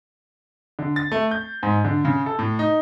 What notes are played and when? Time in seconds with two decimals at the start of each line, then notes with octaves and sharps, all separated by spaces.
0.79 D3
0.96 A6
1.12 A3
1.31 G6
1.63 G#2
1.84 D3
2.05 C#3
2.26 A4
2.39 A2
2.59 D#4